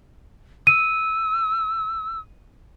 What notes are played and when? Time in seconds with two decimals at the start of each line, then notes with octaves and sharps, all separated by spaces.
0.67 E6 D#7